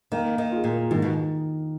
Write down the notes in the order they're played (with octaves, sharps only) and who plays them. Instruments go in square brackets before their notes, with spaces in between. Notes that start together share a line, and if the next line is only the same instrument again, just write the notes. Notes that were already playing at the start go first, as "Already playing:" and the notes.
[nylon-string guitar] D#3 [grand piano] A#3
[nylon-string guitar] D#3
[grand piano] F4 G#4
[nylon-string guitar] A#2
[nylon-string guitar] G#2 [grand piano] D#3
[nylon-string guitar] B2